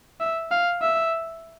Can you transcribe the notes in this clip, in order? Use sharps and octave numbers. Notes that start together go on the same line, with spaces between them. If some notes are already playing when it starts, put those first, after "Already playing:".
E5
F5
E5